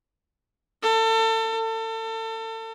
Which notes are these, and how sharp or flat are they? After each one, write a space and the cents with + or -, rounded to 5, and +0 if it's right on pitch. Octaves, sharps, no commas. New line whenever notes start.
A4 +30
A4 +35